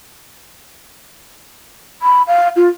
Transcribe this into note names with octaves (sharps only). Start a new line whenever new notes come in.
B5
F5
F4